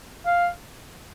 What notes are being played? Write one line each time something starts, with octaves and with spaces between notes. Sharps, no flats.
F5